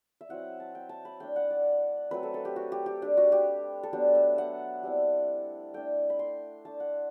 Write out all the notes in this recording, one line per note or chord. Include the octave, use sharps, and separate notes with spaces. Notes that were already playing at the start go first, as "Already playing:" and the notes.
E5
F#3 C4 E4 F#5
A5
G5
A5
B5
A3 D4 G5
F#5
D5
F#3 A3 C4 B4
A4
A4
G4
F#4
G4
G4
A3 D4 G4
F#4
G4
A4
F#3 B3 D4 G4
E5
F#5
G3 C4 E4
A3 D4 G5
B5
C6
A3 D4 A5
F#5